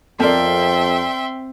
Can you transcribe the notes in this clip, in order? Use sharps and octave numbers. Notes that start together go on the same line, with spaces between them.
F2 C4 A4 A#4 D5 E5 G5 C6